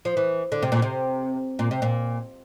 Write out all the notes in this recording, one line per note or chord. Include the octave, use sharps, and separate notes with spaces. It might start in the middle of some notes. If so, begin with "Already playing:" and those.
F3
E3
D3
C3
A#2
C3
A#2
C3
A#2